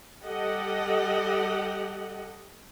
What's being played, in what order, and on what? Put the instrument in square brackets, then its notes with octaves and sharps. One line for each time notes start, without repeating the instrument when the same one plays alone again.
[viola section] G3 G4 A4 D#5 F#5